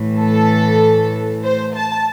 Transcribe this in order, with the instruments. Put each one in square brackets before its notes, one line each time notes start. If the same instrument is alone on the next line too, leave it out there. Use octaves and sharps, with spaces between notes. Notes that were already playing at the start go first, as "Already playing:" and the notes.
Already playing: [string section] A2 E3
A4
C5
A5